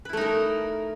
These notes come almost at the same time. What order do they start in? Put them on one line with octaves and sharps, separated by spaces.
B4 E4 A3 D#4 A#4